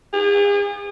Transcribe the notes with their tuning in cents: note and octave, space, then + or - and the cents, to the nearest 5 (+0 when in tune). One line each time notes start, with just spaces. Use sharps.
G#4 -40